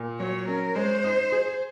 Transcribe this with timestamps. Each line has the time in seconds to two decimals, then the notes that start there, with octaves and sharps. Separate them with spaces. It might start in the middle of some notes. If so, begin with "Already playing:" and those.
Already playing: A#2
0.19 F#3 C#5
0.48 C#4 A#4
0.75 G#3 C5
1.04 D#4
1.32 G#4